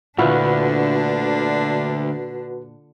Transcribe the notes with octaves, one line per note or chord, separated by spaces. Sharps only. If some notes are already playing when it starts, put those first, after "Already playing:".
D2 A#2 D3 D4 E4 F#4 B4 F5